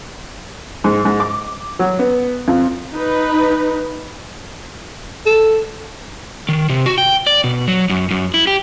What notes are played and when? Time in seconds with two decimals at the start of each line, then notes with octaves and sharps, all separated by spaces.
0.84 G#2
1.05 G#2
1.20 D6
1.79 F#3
1.99 B3
2.48 F2
2.92 D#4 B4
5.26 A4
6.49 D#3
6.69 C3
6.86 F#4
6.98 G5
7.27 D5
7.44 B2
7.68 F#3
7.90 F#2
8.11 F#2
8.34 E4
8.47 G4